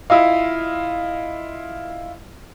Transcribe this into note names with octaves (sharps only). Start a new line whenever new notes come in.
E4 F4 D#5 F5